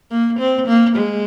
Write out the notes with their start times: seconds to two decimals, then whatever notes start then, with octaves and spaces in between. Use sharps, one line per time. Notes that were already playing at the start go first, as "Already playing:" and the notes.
0.11 A#3
0.39 C4
0.67 A#3
0.96 G#3